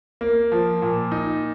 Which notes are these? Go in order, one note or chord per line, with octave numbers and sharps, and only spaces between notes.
A#3
F3
A#2
D#4